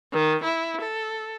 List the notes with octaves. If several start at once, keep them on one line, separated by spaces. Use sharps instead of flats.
D#3
E4
A4